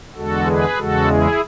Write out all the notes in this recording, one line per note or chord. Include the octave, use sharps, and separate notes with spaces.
E2 D3 G#3 F#4 A4
G#4 B4
E2 C#3 G#3 F#4 A4
E4 G#4